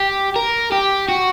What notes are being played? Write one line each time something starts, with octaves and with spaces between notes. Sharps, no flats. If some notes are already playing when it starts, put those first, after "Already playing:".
Already playing: G4
A#4
G4
F#4